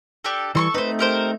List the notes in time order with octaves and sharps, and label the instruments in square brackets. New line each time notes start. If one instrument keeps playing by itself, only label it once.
[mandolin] D4 G4 A4
[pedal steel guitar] E3 G3 [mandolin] A4 C6 C#6
[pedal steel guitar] A3 C4 D#4 [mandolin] B4 C5
[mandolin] G4 A#4 C5